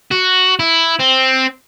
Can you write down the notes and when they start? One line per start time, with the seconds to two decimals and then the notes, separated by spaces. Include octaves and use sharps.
0.11 F#4
0.60 E4
0.99 C4